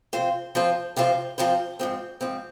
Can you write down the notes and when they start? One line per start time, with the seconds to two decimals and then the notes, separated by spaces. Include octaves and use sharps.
0.13 C3 F3 C4 F4 C5
0.55 C3 F3 C4 F4 C5
0.96 C3 F3 C4 F4 C5
1.38 C3 F3 C4 F4 C5
1.79 G#2 F3 C4
2.21 G#2 F3 C4